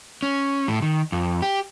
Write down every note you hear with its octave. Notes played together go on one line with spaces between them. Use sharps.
C#4
A2
D#3
F2
G4